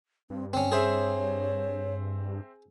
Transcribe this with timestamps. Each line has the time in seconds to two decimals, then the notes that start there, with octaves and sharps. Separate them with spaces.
0.30 G2 C4
0.53 D3 C4 C#4
0.72 C4 G#4 C5 C#5 E5